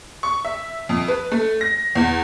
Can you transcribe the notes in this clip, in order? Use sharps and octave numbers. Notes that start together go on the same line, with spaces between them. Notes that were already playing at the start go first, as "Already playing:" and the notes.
C#6
E5
F2
B4
A3
A#6
E2